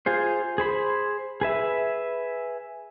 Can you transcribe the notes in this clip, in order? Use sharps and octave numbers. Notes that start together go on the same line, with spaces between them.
F4 G#4 C5
G#4 C5 B5
G#4 B4 E5